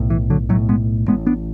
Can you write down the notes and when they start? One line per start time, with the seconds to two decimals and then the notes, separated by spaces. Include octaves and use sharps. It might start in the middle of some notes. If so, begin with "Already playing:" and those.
Already playing: B1 A2
0.10 E3
0.30 D3 F#3
0.49 A2 F#3 A3
0.53 B1
0.69 G#3 B3
1.08 A1 A2 G#3 B3
1.26 B3 D4